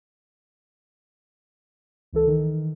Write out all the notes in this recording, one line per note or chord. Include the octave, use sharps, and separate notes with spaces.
C#2 E3 A4
D#3 E3